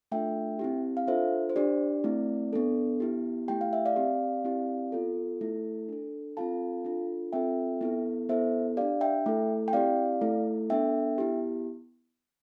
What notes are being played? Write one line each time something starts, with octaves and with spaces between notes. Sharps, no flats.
A3 D4 F4 A4 E5 G5
C4 E4 G4
F5
D4 F4 A4 C5 E5
C5
D4 G4 D5
A3 C4 E4
B3 D4 A4
B3 E4 G4
A3 E4 G4 G5
F5
E5
D5 F5
C4 G4
C4 E4 G4
B3 F4 A4
A3 E4 A4
D4 A4
C4 F4 A4 F5 A5
D4 F4 A4
C4 F4 A4 E5 G5
B3 E4 A4
B3 E4 A4 C5 E5
D4 G4 D5 F5
E5 G5
A3 E4 A4
G5
C4 E4 G4 D5 F5
A3 E4 A4
B3 D4 A4 E5 G5
B3 E4 G4